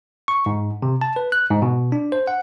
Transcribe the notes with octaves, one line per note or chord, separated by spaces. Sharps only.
C#6
G#2
C3
A5
B4
F#6
G#2
B2
D4
C5
F#5